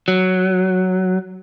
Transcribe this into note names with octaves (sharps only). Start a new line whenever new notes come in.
F#3